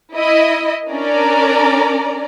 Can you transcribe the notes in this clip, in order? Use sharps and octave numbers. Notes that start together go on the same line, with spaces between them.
E4 D#5
C#4 D4 A#4 D5 A#5